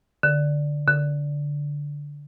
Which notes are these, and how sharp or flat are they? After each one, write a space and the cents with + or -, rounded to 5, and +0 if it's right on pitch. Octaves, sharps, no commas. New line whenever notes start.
D3 +0
D3 -10